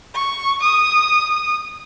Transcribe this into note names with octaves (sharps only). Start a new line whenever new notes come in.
C#6
D#6